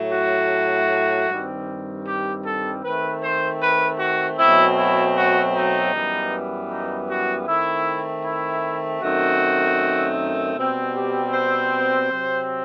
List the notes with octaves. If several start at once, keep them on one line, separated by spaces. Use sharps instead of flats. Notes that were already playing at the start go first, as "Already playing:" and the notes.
Already playing: A2 F#3 A3
F#4
G2 D#3 G3 C4
G4
A4
D#3 A3 C4 B4
C5
B4
F#4
B2 F#3 A3 C4 E4
E4
F#4
D#4
F#2 E3 G3 B3
D#4
F#4
D#3 A3 C4 E4
E4
F#2 D#3 A3 C4 F#4
B2 G3 C4
G4
C5
C3 F#3 C4